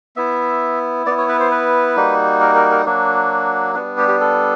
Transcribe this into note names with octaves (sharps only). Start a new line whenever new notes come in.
B3 E4 E5
B3 E4 D5
C#5
B4
C5
B4
G3 A#3 D#4 F#4
A#4
A#4
A#4
F#3 A#3 D4 F#4
G3 B3 D4 F#4
G4
G4
A4